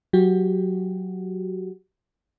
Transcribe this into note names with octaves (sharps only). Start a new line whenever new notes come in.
F#3 F#4 G4